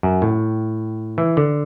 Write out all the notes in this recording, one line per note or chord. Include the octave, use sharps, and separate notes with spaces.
F#2
A2
E3
D3